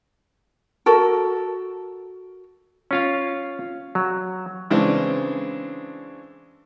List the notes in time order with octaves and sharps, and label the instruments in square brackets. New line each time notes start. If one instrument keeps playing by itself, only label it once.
[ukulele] F#4 A4 A#4
[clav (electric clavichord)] C#4 F4 F5
F#3
[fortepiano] C#3 E3 G#3 C4 D4 C5